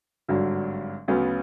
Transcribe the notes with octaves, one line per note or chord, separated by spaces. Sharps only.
G#1 G2 D3 F#3
D2 C#3 F#3 B3